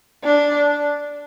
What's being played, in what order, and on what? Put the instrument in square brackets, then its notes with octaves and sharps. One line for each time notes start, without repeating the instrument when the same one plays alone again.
[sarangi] D4